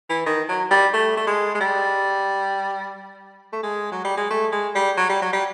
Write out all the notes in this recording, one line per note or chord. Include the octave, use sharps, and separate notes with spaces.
E3
D#3
F#3
G3
A3
A3
G#3
G#3
G3
A3
G#3
F#3
G3
G#3
A3
G#3
G3
F#3
G3
F#3
G3